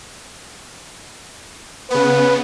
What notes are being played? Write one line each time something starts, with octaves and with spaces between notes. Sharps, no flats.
C#3 B3 B4